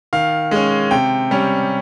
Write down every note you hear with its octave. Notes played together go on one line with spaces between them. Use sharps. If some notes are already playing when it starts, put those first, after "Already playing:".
D#3 F5
G#3 C#4
C3 G5
G3 C#4